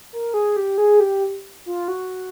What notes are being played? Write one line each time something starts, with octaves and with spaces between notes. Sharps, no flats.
A#4
G#4
G4
G#4
G4
F4
F#4